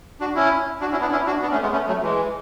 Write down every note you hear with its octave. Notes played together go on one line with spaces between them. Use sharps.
D4 F#4
C#4 E4
D4 F#4
C#4 E4
B3 D4
C#4 E4
D4 F#4
B3 D4
A3 C#4
G#3 B3
A3 C#4
F#3 A3
E3 G#3